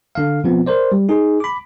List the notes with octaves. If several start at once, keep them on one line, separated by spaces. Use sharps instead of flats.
D3 F5
B2 F3 B3 C4
A#4 C5 D5
G3
D#4 G#4
B5 D6